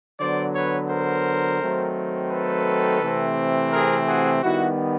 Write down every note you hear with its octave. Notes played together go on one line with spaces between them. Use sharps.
D3 F#3 B3 C5 D5
B4 C#5
A#4 C5
D#3 F#3 A3 C4
A4 B4
C3 E3 A3 C4
G#4 A#4
F#4 G#4
D#3 G3 B3 E4 F#4